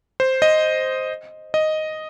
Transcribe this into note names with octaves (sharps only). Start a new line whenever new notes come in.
C5
D#5
D#5